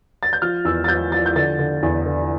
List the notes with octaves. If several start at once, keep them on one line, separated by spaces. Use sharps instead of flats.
A6
G6
F3 F6
E2 E6
A6
F3 G6
F3 A6
G6
D3 A6
D3
E2
D3